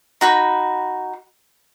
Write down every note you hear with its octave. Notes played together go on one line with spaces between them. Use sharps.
D#4 F#4 B5